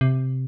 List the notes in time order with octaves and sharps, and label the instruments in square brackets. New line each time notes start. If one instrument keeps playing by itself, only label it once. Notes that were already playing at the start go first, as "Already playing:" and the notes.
[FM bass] C3